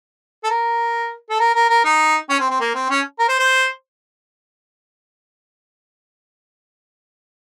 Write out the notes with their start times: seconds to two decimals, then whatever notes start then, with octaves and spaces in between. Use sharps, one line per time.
0.44 A4
0.50 A#4
1.30 A4
1.40 A#4
1.55 A#4
1.70 A#4
1.85 D#4
2.30 C#4
2.40 C4
2.50 C4
2.60 A#3
2.75 C4
2.90 C#4
3.19 A#4
3.29 C5
3.39 C5